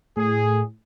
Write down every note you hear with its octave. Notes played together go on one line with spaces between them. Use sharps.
A2 G#4